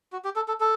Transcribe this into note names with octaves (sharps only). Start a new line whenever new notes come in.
F#4
G4
A4
A4
A4